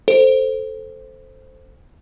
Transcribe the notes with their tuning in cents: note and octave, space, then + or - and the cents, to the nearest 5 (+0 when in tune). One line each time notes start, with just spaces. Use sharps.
A4 +0 C5 +0